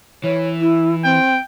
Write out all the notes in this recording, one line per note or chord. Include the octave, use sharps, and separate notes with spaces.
E3 C#5
E4
C4 G5